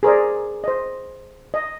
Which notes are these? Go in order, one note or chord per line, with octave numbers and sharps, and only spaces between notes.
G#4 A#4 C5 D5
C5 D#5
D#5